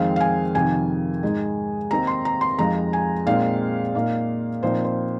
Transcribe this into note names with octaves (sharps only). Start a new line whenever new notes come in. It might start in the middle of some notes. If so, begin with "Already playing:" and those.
Already playing: F2 D#3 G#3 C4 D#4 F5
F5
G#5
F2 C3 D#3 G#5
G#2 G#3 D#4
D#2 D#3 C4 D#4 A#5
C6
A#5
C6
F2 F3 G#3 D#4 A#5
G#5
A#2 G#3 C4 D#4 F5
A#2 A#3 D#4
A#2 F3 C4 D#4 C5
C5